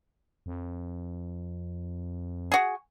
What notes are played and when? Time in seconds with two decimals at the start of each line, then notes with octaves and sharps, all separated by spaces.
0.46 F2
2.52 F#4 G#4